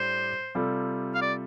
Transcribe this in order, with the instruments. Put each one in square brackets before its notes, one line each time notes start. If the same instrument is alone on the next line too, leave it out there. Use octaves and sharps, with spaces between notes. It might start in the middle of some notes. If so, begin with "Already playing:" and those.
Already playing: [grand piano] A2 G3 D4 G4 [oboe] C5
[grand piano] C3 G3 F4 A4
[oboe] F5
D5